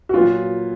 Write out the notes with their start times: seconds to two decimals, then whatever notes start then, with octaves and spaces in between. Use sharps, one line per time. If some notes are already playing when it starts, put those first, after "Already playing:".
0.09 F#4
0.13 A#2 F#3 B3 F4